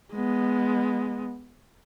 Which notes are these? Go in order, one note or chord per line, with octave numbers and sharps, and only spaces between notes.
G#3 B3